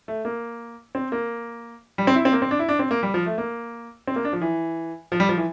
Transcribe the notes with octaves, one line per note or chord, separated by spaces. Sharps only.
A3
A#3
C4
A#3
G3
C4
E4
C4
A#3
C4
D4
E4
D4
C4
A#3
G3
F3
A3
A#3
C4
A#3
D4
F3
E3
F3
G3
F3
E3